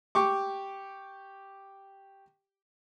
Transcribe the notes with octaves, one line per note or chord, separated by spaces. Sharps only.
G4 C#6 D6